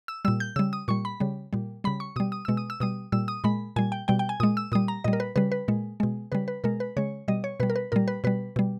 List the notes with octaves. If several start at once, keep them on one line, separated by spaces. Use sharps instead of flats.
E6
A#2 G3 E6
G6
C#3 G3 E6
D#6
A#2 G3 C#6
B5
C#3 G3
A#2 G3
C#3 G3 B5
C#6
B2 G3 D#6
D#6
B2 G#3 E6
D#6
E6
B2 G3 D#6
A#2 G3 E6
D#6
A#2 G#3 B5
A#2 G3 G#5
G5
B2 G3 G5
G5
G#5
A#2 G#3 D#6
E6
A#2 G3 D#6
A#5
A#2 G3 D#5
A#4
B4
C#3 G3 B4
B4
A#2 G#3
B2 G#3
C#3 G3 B4
B4
B2 G#3 A#4
B4
C#3 G#3 C#5
B2 G3 D#5
C#5
B2 G3 B4
A#4
B4
A#2 G3 A#4
B4
B2 G3 B4
B2 G3